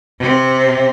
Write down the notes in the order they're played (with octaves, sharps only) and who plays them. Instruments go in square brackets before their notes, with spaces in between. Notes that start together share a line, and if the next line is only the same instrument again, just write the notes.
[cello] C3 C4